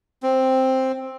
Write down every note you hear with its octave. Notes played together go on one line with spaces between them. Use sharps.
C4